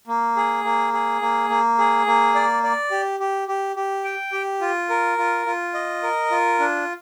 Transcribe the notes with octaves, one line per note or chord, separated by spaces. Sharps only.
A#3
G#4
A#3
G#4
A#3
A#3
G#4
A#3
D5
D5
G4
G4
G4
G4
G5
G4
F4
A#4
F4
F4
D#5
A#4
F4
D4